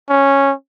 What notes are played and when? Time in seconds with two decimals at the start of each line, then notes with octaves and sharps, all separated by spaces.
0.09 C#4